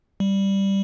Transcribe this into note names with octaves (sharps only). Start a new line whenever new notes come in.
G3